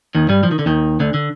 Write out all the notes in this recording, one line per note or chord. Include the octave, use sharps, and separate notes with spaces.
D#2 D#3
G2 G3
F3
D#3
D3
D#2 D#3
D2 D3
D3